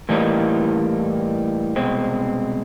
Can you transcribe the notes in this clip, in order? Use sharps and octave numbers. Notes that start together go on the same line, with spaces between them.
A2 E3 G3 A#3 D#4
C2 B2 G#3 C4